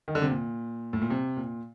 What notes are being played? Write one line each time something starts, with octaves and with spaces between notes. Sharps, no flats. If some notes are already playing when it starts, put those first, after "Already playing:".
D#3
D3
C3
A#2
A2
A#2
C3
A#2